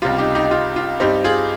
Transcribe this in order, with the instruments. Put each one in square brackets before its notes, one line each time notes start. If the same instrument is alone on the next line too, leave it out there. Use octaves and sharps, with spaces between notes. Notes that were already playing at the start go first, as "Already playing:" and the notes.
[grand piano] C#2 C3 G3 F4
D#4 G4
D#4 G4
D#4
F4
F4
G2 G3 C4 D#4 G4
F4 G#4